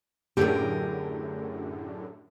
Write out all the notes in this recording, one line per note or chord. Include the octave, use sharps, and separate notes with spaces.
F#2 A2 D3 G4 G#4 A#4